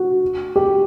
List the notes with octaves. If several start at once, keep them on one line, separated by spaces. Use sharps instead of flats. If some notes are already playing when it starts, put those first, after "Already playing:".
Already playing: F#4
G4